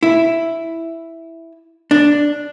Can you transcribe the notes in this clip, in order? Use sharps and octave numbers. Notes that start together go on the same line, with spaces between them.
E4
D4